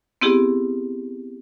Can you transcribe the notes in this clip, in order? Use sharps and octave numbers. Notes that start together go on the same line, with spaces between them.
B3 C4 E4 G4 G#4